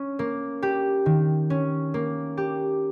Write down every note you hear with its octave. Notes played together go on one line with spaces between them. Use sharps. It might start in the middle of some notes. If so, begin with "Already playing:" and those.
Already playing: C#4
A#3
G4
D#3
C#4
A#3
G4